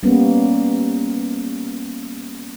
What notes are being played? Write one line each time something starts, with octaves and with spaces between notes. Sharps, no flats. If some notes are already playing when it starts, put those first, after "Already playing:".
G3 A#3 B3 C#4